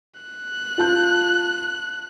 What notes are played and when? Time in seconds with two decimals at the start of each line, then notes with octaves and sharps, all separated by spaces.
0.20 F#6
0.78 F4 A5 G6